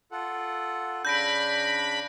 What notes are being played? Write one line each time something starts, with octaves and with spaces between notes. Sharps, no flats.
F4 A4 F#5
C#3 D4 B5 G6 A#6 D7